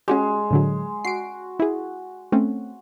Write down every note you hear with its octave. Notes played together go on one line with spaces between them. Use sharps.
G#3 C#4 F#4 G4
A2 D3 F#3
F#4 C7 D7
E4 G#4
A3 C4 C#4